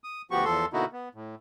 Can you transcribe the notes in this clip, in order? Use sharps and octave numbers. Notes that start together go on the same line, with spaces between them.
D#6
D2 F3 B3 F#4 G4 C#6
E2 F3 A4 C6
B2 D3 A#3 D#4 E4 F#4
B3
A2